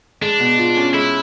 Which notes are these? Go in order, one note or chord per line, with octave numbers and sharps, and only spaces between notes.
G#3 D4
B2
F4
C#4
G#3 E4